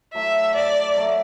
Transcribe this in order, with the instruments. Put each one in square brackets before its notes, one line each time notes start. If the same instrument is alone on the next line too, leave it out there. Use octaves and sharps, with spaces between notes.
[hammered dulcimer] F#3 A3 E4 [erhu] E5
[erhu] D5
[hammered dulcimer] F#3 A3 E4